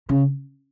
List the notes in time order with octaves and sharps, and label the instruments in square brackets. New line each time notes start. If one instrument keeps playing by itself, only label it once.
[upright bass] C#3